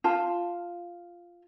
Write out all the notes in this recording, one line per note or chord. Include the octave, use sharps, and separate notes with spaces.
F4 A5